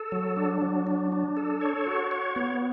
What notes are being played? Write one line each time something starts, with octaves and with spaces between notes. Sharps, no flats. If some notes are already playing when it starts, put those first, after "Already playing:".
Already playing: A4
F#3
D4
F#3
D4
D4
A4
C#5
F#4
C#5
B3